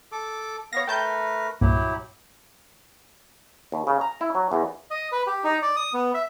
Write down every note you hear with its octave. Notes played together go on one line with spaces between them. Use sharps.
A4 D6
B3 C#5 F5 A#6
A3 A#4 B4 G5 A5 G6
C2 G2 A#2 F#3 E4 G4
D#2
C#3
A#5
E4
F#3
E2
D#5
B4
G4
D#4
D5
D#6
B3
E5